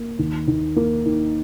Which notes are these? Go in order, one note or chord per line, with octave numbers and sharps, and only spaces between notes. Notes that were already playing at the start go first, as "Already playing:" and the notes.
Already playing: A#3
D#2
D#2
A#3
D#3